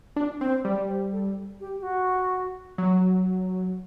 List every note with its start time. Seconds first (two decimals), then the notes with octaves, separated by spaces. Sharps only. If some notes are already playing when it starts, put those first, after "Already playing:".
0.16 D4
0.41 C4 C5
0.65 G3
0.88 C5
1.12 A4
1.60 G4
1.79 G4
1.83 F#4
2.78 F#3